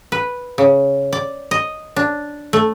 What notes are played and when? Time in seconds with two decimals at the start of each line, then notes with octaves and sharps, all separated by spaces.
0.12 B4
0.58 C#3
1.12 D5
1.51 D#5
1.96 D4
2.53 A3